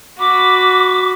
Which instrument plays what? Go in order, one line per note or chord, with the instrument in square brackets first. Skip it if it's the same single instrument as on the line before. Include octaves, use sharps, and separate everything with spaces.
[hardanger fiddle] F#4 B5 [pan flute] D6